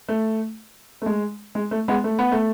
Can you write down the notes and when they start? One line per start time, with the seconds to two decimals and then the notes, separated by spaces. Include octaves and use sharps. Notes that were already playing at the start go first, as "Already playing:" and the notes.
0.09 A3
1.02 A3
1.06 G#3
1.55 G#3
1.71 A3
1.88 G#3 B3
2.04 A3
2.19 B3
2.32 A3